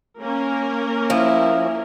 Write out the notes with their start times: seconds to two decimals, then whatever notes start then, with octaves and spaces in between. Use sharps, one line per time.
0.21 A#3 C#4 A#4
1.10 F3 E4